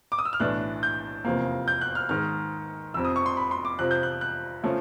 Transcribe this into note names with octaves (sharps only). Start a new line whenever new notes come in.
D6
D#6
E6
F6
B1 A2 E3 A3 D4 F#6
G6
F1 E2 C3 F3 A#3
G6
F#6
F6
G#2 D#3 G#3 F6
F1 F2 C3 E6
D#6
C#6
C6
B5
C6
D6
F2 C3 F3 F#6
G6
F#6
F#6
C#3 F3 A3 C#4